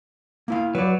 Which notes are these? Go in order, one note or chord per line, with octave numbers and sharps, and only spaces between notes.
A#3 E4 F5
F#3 B4 D5